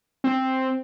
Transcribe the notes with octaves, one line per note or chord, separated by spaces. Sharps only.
C4